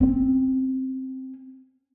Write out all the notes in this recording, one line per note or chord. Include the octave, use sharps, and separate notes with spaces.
C4 C#4